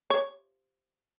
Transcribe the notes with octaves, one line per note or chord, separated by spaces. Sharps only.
C#5